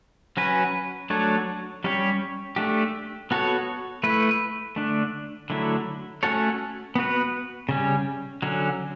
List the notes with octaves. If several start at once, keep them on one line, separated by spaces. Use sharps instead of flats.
F#3 C#4 F#4 B4
F#3 A3 D4 A4 C#5
G3 C#4 G4 C#5
A3 D4 G4
B3 F#4 A4 C#5
A3 E4 B4
D3 A3 D4
D3 F#3 A3 E4
A3 C#4 F#4 A4 C#5
B3 F#4 B4
C#3 G3 C#4
D3 F#3 C#4